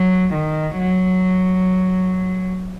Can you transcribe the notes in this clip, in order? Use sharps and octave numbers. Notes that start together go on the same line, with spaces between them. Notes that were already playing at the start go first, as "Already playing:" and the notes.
Already playing: F#3
D#3
F#3